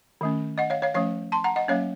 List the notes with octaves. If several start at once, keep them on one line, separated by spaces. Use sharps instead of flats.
D#3 A3 C#4
D#5 F#5
C#5 F5
C#5 F5
F3 A3 C#4 C#5 F5
A5 C6
F#5 A#5
D#5 F#5
F#3 A#3 C#4 C#5 F5